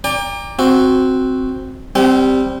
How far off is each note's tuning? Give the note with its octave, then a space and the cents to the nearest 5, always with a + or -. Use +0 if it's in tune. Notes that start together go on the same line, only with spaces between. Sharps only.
D5 +0 G5 +40 A#5 +0
C4 +0 F#4 +0
G3 +0 C4 +0 G5 -45